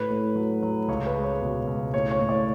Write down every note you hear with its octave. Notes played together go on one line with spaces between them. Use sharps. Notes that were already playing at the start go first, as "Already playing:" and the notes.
Already playing: A2 B4
A2
F#3
F#3
C#2 C#5
B4
G#3
C#5
B2
C#2
A2 C#5
C#5
A2
D5